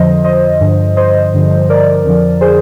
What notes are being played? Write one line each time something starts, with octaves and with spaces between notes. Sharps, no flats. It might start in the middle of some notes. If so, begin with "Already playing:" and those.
Already playing: F2 D3 F3 C5 D#5
C5 D#5
G2 D3 F3
C5 D#5
G2 D3 F3
A#4 D5
F2 D3 F3
G#4 C5